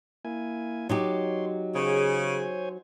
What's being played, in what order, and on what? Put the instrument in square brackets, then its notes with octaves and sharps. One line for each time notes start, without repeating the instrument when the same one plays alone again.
[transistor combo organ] A#3 E4 G#5
[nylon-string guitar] F#3 D#4 G4 [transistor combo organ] C#5 C6
[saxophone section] C#3 [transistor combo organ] C5 C#5 G#5